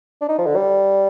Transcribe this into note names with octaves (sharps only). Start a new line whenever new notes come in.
D4
D#4
F3
D3
G3